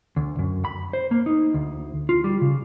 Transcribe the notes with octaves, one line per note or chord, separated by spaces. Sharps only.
D2
F#2
B5
C5
A#3
D#4
D2
F4
G3
C#3